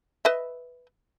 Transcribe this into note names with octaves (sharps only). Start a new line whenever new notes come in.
B4 D#5 E5